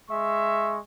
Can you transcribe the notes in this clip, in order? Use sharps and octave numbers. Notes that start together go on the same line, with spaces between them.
G#3 E5 C#6